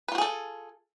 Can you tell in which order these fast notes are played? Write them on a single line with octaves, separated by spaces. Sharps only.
B4 F4 F#4 G#4 A4